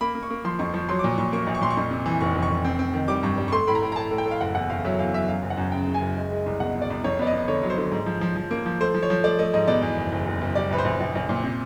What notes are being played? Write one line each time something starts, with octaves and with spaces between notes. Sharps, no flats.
A#3 B5
A#3
C#6
A#3
F3 C6
F2 C#6
F3 C#6
F#3 C6
D6
A#2 C#6
A#2 C#6
A#3 C#6
A#1
C#6
A#2 C6
C#6
F2
C3
E3
F1 C#6
F1
C#6
F1
C4
C4
D#3
G3 D6
G2 C#6
G3
C#6
A3 C6
A2 B5
A#5
A2
A#5
A2 A5
A2
G5
A2
F5
F#1 F#5
E2 F#5
F#1 F5
F#3 E5
E2 F5
F#3 E5
F#2 F5
F#1
F#5
F#2
C#3 G5
C#3
G#5
F#1
G#3
G#3
C2
B2 F#5
B2
D5
C2
F2 C#5
B3 D5
D#5
B3
D3 C#5
F#3
C5
D3
G#2
F3
F3
F3
A#3
F3
A3 C5
F3
C#5
F3
A3 D5
A3 D#5
G#2 D#5
B2 D5
E2
F#1
F#1
F#1
F#1
G3 D5
A#1 B4
C5
A#1
A#1
A#1
A#2
C3